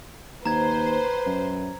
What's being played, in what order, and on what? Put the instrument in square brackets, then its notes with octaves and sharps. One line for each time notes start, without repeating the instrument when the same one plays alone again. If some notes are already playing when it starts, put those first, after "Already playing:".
[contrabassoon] D#2 [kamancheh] B4 [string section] C5 [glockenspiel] A#5 G#6
[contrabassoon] F#2